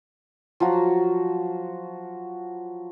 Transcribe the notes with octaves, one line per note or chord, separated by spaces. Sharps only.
F3 F#3 F#4